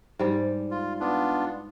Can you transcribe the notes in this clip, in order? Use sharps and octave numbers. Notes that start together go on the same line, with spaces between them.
G#2 G3
F4
B3 D4 F4